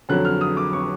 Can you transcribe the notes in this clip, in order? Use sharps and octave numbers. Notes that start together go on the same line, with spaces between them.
F2 D3 F#3 F#6
F6
D#6
D6
C#6